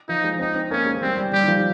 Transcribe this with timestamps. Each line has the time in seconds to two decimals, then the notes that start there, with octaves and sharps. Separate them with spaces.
0.09 F3 D#4
0.24 G#3
0.39 C4 D#4
0.55 C4
0.71 A#3 C#4
0.86 G#3
1.01 G3 C4
1.17 G3
1.32 G3 G4
1.42 D#3
1.48 F3